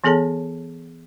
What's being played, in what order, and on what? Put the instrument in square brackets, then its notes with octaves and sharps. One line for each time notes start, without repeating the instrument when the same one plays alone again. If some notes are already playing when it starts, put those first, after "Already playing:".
[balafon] E3 B3 G#4 A4 C#5 A5